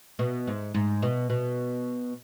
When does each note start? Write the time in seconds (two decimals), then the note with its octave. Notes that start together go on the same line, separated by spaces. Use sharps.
0.19 B2
0.47 G#2
0.74 G#2
1.03 B2
1.30 B2